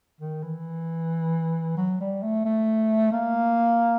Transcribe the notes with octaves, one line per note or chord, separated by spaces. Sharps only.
D#3
E3
F#3
G3
A3
A3
A#3